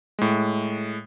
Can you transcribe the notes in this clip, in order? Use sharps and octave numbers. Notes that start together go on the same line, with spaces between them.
A2 G#3